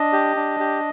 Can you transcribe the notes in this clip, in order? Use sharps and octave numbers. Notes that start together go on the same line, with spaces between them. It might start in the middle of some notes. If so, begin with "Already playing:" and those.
Already playing: D4 D#5
G4
D4
G4